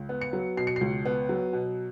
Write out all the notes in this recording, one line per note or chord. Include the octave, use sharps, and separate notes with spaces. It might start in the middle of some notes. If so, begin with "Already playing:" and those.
Already playing: C#2
B3
C#7
F#3
B2 C7
C#7
C#2 C7
B3
F#3
B2